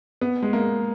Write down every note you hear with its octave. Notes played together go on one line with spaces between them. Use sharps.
B3
G#3
A#3